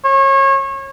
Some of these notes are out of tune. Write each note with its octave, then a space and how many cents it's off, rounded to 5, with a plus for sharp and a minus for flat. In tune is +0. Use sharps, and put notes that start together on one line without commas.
C#5 -30